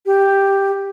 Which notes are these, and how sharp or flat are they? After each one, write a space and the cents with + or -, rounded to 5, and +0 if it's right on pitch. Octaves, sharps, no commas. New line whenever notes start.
G4 +5